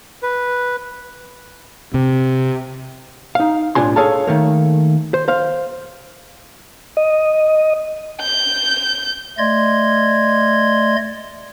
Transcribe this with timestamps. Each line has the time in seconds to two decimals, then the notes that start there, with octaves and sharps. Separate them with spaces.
0.23 B4
1.94 C3
3.35 D#4 F5
3.75 B1 A2 D4 F4 G#5 C6
3.96 G#4 A4 C#5 F5 A5
4.27 D#3 A3 A#3
5.14 C5
5.28 C5 F5
6.97 D#5
8.21 G6
9.38 A3 D5 D#5 C6 G#6